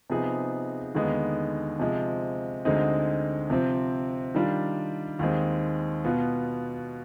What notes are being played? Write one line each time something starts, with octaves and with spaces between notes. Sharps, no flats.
C3 F3 B3 D#4 G#4
D#2 D3 G#3 B3 D#4
C3 F3 G#3
D2 D3 G#3 C4 D#4
C3 F3 C4
D#3 G3 D4 F4
D#2 D#3 G#3 C4
B2 B3 F4